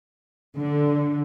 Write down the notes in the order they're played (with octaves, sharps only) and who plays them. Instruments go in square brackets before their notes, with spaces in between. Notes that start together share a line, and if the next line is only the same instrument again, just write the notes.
[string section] D3